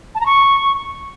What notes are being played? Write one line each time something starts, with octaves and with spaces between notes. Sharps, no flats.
A5
A#5
C#6